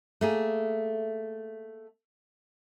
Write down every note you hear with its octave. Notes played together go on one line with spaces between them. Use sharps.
A3 A#3 G#4